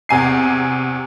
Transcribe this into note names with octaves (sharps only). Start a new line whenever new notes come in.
E2 C3 G#5 C7